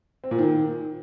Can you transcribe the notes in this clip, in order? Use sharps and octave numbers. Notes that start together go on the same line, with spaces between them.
C4
A#2
D#3